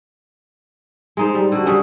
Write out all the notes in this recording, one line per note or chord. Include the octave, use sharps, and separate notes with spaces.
G#3 D#4 C5
G3
D3 F#4
C#3 G3 C#4